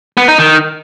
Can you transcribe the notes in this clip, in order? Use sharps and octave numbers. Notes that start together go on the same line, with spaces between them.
B3
D#4
D#3